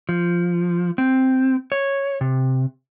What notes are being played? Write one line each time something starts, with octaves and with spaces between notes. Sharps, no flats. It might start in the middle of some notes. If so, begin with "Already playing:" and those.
F3
C4
C#5
C3